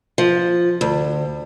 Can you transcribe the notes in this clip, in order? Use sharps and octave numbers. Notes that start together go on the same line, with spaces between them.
F3
D2